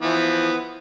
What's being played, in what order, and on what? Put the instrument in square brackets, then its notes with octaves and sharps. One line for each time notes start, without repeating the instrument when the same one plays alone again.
[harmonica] E3 F3 B3